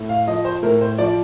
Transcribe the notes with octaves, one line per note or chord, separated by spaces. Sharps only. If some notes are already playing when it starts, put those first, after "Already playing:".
Already playing: A2
F5
F3 D#5
C5
A2 A#4
C5
F3 D5